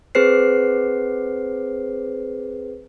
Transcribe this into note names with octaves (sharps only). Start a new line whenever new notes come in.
C4 G#4 B4 C5 C7